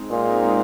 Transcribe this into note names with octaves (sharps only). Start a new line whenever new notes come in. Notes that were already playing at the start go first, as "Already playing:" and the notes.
Already playing: G#3 C4 D#4
A#2